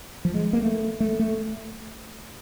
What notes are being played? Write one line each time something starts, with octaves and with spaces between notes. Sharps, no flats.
F3
G#3
A#3
A3
A3
A3